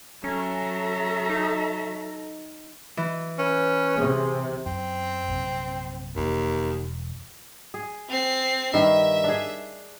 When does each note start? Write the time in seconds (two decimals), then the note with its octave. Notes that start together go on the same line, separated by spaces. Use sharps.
0.24 F#3 C#4 A4 E5 A#5
1.30 D#4
2.97 E3
3.39 C#4 B4
3.97 C3 G#4
4.66 F#2 C4
5.28 A#1 F#2 C3
6.16 E1 D#2
7.74 G#4
8.09 C4 C7
8.74 G2 D#3 E5
9.24 D4 G#4